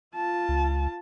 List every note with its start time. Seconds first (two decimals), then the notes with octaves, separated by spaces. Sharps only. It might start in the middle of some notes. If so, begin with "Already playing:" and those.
0.15 F4 A5
0.49 C#2